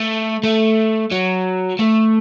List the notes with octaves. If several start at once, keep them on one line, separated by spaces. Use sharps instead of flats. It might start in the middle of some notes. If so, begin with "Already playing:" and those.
Already playing: A3
A3
F#3
A3